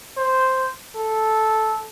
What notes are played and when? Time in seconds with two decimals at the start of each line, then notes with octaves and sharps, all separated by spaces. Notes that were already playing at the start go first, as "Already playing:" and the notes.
0.17 C5
0.95 A4